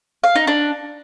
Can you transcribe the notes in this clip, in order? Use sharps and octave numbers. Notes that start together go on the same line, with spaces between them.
F5
D#4
D4